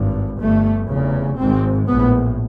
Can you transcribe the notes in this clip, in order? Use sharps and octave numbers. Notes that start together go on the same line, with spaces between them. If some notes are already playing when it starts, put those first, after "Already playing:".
Already playing: G#1 G2
G1 G2 A3
F1 E2 C#3
G#1 G#2 C4
A#1 A2 B3